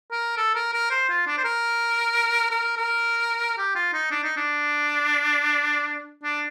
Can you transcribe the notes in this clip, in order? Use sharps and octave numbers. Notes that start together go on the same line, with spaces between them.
A#4
A4
A#4
A#4
C5
F4
D4
C5
A#4
A#4
A#4
G4
F4
D#4
D4
D#4
D4
D4